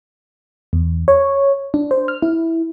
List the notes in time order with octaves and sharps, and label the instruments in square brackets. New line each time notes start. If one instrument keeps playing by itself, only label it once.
[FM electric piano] E2
C#5
D4
C5
F6
E4